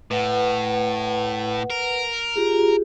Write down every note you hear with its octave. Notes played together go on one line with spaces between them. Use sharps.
A2 B4 F#5
A#4
F4 G4 G#4